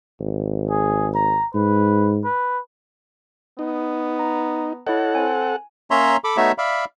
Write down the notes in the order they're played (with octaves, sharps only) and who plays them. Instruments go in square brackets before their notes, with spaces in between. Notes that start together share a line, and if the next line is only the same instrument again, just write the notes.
[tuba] G#1
[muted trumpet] G#4
A#5
[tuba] G#2 [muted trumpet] B4
[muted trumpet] B4
[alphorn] B3 [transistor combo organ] D#4
[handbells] A#5
[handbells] E4 C#5 D#5 [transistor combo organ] A4 F#5
[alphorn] C4 [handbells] G#5
[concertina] A#3 C#4 C#5 E5 A#5 C6
A4 B5 D6
A3 B3 D#4 F#4 C#5 E5
D5 E5 F5 B5